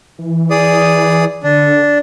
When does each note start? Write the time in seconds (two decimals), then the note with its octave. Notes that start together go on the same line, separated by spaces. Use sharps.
0.18 E3
0.50 G#4 D5 D#6
1.43 D3 D4